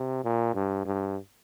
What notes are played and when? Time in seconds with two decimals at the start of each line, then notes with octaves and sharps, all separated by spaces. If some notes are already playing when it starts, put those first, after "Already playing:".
Already playing: C3
0.24 A#2
0.54 G2
0.85 G2